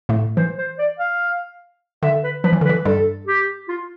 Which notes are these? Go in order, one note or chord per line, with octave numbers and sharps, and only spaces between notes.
A2 A3
E3 C5
C5
D5
F5
D3 E5
B4
F3 B4
E3
D3
B4
E3
G2 G3 A4
G4
F4